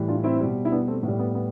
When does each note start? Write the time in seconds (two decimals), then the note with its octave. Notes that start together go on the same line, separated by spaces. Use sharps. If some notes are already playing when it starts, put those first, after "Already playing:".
Already playing: A2 E3 G3
0.08 D4 F4
0.24 C4 E4
0.40 B2 G3
0.65 E4
0.72 B3 D4
0.88 A3 C4
1.03 A2 B3
1.08 G3
1.19 B3
1.35 B3